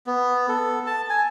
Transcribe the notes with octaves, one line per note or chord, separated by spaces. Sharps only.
B3
A4
A5
G#5